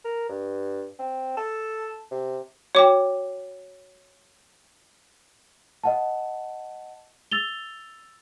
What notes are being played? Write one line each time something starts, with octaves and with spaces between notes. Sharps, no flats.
A#4
G2
C4
A4
C3
F#4 C#5 G5 D6
D#5 F#5 A5
E6 A6 F7 G7